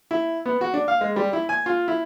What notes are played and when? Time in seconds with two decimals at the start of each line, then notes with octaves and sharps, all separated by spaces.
0.11 E4
0.46 B3
0.61 F#4
0.74 D4
0.88 F5
1.01 G#3
1.16 G3
1.33 E4
1.49 G#5
1.66 F4
1.88 E4